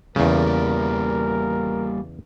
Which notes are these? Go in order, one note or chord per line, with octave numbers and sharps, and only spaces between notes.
E2 C#3 G3 A#3 A#4